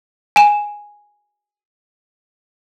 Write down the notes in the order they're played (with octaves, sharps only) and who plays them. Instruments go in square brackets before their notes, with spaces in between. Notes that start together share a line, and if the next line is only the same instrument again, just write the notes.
[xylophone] G#5 E7